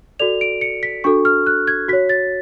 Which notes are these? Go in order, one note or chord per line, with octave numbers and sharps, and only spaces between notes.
F#4 A4 D5 F7
D7
C#7
B6
D4 F#4 A4 C#6
F6
F#6
G#6
F#4 C#5 B6
A6